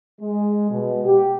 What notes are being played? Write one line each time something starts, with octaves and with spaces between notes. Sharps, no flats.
G#3
B2
G4